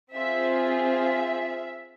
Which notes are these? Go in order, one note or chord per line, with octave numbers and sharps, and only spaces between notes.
C4 F4 G#4 E5
E5